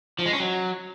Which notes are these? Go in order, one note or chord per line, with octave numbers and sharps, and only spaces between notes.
F3
G#3
C#4
F#3